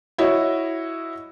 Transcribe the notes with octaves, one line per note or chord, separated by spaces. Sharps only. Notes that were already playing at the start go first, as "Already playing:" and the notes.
E4 F#4 C#5 D#5